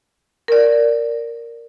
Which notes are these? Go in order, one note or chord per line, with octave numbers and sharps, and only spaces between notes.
A#4 D5